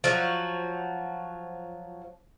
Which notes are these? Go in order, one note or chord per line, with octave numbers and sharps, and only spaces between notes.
F3 F#3 F#4